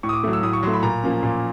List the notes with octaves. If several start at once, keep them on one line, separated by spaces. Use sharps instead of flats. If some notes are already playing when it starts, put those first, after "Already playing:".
A2 C#6
D#6
D6
F#3 A3
E6
A2 D#6
C#6
F#3 A3 C6
B5
A#2 A#5
F3 A#3 C#4
A#2